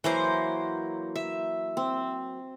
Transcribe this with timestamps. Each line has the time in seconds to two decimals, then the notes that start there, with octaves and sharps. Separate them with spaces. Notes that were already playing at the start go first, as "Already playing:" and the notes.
0.04 E3 F#3 A#3 C5
1.16 E5
1.77 C4